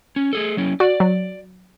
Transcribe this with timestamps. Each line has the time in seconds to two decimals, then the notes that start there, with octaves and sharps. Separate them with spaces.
0.16 C#4
0.33 A3 G#4 A4
0.57 F#3 C#4 E4
0.80 F#4 D5
1.00 F#3